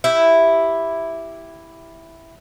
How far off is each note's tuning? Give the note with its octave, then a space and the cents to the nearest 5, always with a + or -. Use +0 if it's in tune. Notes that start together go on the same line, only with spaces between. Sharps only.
E4 +0 G4 +0